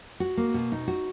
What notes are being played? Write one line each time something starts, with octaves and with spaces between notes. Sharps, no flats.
F#4
A#3
B2
D#4
F#4